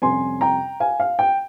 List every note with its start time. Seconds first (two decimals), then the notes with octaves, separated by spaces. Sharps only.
0.02 F2 C3 G3 C#4 G#5 C6
0.41 G5 A#5
0.80 F5 G#5
1.00 F5
1.19 G5